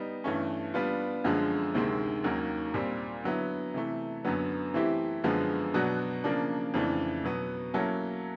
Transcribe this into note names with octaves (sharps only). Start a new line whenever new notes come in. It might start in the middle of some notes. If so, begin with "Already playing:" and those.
Already playing: G3 B3 D#4
G2 E3 A3 C#4
G3 B3 D4 F4
F#2 D3 F3 G#3
D2 C3 D#3 G#3 C4
D#2 D#3 F#3 A#3 C#4
A#2 G3 C4
D3 F#3 B3 E4
C3 E3 A3
F#2 D3 F#3 B3
E3 A3 C4 E4 G4
F#2 D3 F3 G#3 B3
B2 F#3 B3 D4 F#4
C#3 F3 A#3 D4
F2 C#3 E3 A3 D4
B2 F#3 B3
F#3 A#3 C#4 E4 A4